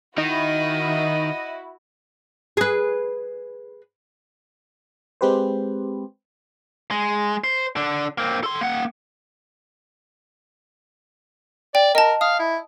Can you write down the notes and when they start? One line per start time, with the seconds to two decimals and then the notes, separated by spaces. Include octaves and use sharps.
0.18 D#3 D#4 E4 F#4 D#5
2.57 G#4 B4
5.21 G#3 C4 G4 B4 C5
6.91 G#3
7.44 C5
7.76 D3 D4
8.18 A#3 C4
8.43 A4 C6
8.61 A#3 F#5
11.75 D5 G5
11.95 A#4 D#5 A5
12.21 F5 D#6
12.40 E4